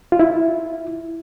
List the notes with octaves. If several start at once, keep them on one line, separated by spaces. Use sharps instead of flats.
F4
E4